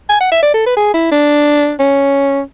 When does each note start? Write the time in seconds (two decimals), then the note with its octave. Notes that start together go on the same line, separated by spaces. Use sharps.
0.09 G#5
0.21 F#5
0.32 E5
0.43 D5
0.54 A4
0.66 B4
0.77 G#4
0.94 E4
1.11 D4
1.79 C#4